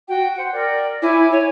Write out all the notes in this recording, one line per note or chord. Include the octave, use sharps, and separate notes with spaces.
F#4 G5
C5 F#5
A#4 D5 G5
E4 C#5 G#5 D6
C#5 G#5